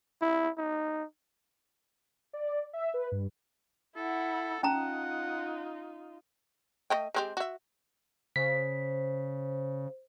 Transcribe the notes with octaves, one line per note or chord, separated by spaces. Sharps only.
E4
D#4
D5
E5
B4
G2
E4 A4 F#5
C#4 D#4 F4 F#5 A5 A#5
A3 D#5 G5
G#3 C4 G4
F#4 E5
C#3 C5 B6